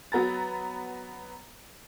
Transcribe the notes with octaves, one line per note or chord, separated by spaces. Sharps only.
F#3 B3 A#5 A6